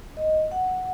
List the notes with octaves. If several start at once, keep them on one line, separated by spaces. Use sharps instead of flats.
D#5
F#5